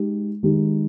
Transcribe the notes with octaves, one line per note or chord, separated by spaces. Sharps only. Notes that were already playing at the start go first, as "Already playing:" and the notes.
Already playing: G#3 D#4 G4
D#3 G#3 D#4 G4